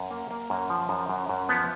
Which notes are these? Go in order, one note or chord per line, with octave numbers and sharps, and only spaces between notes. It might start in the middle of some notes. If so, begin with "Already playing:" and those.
Already playing: F#2
A#3
A#3
F#2
F3
F#2
F#2
F#2
F3 B3